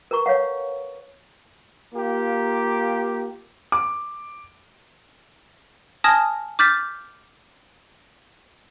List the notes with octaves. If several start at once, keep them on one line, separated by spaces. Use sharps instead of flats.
A#4 B4 A#5 C#6
C#5 F5 F#5
A#3 F4 G4
D6
G#5 A5 D#6 F6 G#6 A#6
D6 F6 G6 A6 B6